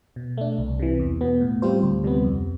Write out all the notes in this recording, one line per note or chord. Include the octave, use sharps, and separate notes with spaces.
B2
A3 D4
C2
C3 E3
E2
B2 B3
A2
G3 C4 F4 C5
D2
C3 G3 B3
F2